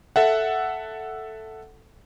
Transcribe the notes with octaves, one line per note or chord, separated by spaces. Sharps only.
A4 E5 F#5